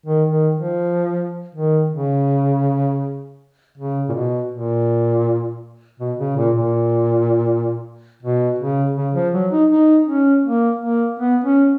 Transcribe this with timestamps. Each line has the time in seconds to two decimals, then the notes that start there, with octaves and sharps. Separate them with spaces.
0.06 D#3
0.30 D#3
0.55 F3
1.55 D#3
1.91 C#3
3.77 C#3
4.09 A#2
4.13 B2
4.51 A#2
5.99 B2
6.19 C#3
6.37 A#2
6.55 A#2
8.23 B2
8.59 C#3
8.96 C#3
9.15 F3
9.33 F#3
9.52 D#4
9.70 D#4
10.07 C#4
10.45 A#3
10.81 A#3
11.19 B3
11.44 C#4